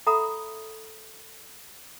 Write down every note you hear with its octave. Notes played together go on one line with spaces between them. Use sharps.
A4 E5 F#5 A#5 B5 D#6